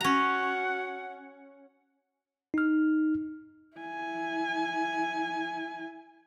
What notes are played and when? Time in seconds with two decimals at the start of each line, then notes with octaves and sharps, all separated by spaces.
0.01 C#4 F#4 F#5 A#5
2.54 D#4 F6
3.77 E4 G#5